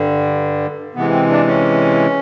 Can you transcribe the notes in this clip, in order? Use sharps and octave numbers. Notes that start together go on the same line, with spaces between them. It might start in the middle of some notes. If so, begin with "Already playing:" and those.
Already playing: G2 D3 G3
C3 E3 G#3 B3
C4
D4
C#4